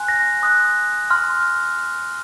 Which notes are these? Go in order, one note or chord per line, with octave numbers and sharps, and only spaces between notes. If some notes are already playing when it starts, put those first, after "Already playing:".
Already playing: G#5 C6 F#6
A#6
C6 D#6 F#6
C6 F6